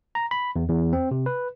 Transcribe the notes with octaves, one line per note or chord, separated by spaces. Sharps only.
A#5
B5
E2
E2
C4
C3
B4